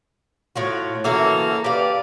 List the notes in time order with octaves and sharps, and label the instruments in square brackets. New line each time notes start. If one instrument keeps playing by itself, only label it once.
[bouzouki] A2 F4 F#4
[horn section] C#3 A#3 A4 [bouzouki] E3 F#4 E5
[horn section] G4 D5 [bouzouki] B4 F5